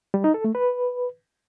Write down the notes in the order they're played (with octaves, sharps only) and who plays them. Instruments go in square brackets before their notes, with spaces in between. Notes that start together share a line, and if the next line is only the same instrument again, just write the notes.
[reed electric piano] G3
D#4
A4
A3
B4